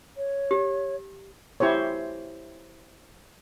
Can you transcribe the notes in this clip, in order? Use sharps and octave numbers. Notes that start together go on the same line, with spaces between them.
C#5
G4
E4 G4 C5 C#5